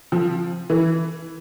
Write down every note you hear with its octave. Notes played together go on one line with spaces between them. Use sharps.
F3
E3